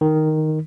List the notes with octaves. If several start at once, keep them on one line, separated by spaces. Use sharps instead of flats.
D#3